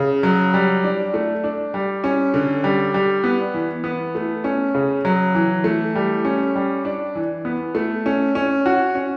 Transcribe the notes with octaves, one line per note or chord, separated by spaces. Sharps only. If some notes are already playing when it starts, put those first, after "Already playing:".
Already playing: C#3
F#3
G3
D4
A3
D4
G3
C#4
D3
G3
G3
B3
E3
B3
A3
C#4
C#3
F#3
E3
A3
G3
C#4
G3
D4
E3
B3
A3
C#4
C#4
F#4
C#4